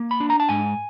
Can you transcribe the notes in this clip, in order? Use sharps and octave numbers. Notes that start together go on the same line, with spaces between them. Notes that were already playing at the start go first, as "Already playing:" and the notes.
Already playing: A#3
B5
D4
A#5
A5
G#2 G#5